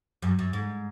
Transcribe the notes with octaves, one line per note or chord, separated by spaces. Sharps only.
F#2
F#2
G#2